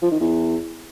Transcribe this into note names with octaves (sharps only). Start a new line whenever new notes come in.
F3
D#3
E2